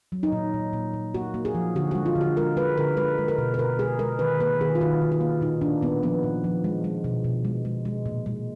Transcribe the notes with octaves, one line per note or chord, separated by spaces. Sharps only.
F#3
D#4
A#2
A#2
A#2
A#2
A#3 F#4
A#3
G#4
F3
D3 F#4
G#3 F#4
F4
D3
F#4
G#3 A#4
G#3 B4
D3 A#4
G#3 B4
G#3
A#4
B2
B4
B2 A#4
G#3 G#4
G#3 A#4
D#3 B4
A#3 B4
D#3 G#4
F4
D#3 F#4
D#3
F4
A#3
A#2 D#4
A#2 D4
A#2 B3
F3 B3
A#2
F3
G#3
G#3
B2
B2
G#3
G#3
G#3
A#2
G#3